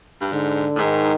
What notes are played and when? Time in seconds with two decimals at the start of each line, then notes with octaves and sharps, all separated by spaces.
0.22 G2
0.32 G#2 D3
0.76 A2
0.79 G#2 D#3